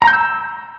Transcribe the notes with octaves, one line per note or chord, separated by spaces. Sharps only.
A#5
G6
E6